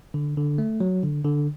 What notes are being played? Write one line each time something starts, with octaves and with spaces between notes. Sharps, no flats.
D3
D3
A3
F#3
D3
D3